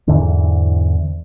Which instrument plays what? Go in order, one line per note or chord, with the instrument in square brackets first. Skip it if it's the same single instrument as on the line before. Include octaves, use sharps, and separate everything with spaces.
[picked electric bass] E2 G#2 D3 E3